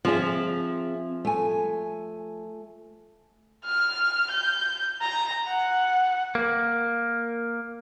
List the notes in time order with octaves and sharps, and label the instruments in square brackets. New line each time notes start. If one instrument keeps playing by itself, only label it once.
[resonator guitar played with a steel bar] F3 [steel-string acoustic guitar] C4 G#4 E5
[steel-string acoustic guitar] A3 G#5
[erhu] F6
G6
A#5
F#5
[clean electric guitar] A#3